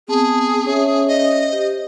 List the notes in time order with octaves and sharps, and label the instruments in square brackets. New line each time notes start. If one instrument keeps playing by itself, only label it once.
[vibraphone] B3 C4 A5 [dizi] G#4
[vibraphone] C#4 C#5 E5
[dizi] D#5
[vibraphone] G4 C5